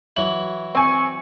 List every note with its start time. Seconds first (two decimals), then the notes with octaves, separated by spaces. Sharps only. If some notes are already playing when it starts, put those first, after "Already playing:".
0.16 E3 F#3 E4 F#7
0.75 C4 G#5 C#6